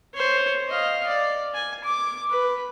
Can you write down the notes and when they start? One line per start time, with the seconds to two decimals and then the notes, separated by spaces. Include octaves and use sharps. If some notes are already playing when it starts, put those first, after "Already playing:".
0.14 C5 C#5
0.69 D#5 F5
1.07 D5
1.54 G#5
1.84 D6
2.30 B4